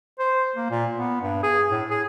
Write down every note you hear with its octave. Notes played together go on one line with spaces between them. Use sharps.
C5
A#3
A#2
B3
G2
G#4
A2
G#4